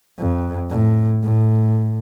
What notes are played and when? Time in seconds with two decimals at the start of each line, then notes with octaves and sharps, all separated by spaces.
0.18 F2
0.70 A2
1.23 A2